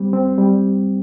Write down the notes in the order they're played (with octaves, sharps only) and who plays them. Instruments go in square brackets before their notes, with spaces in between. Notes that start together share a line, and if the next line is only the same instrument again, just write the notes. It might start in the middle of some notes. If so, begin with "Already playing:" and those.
Already playing: [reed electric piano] G3 C4
C4
G3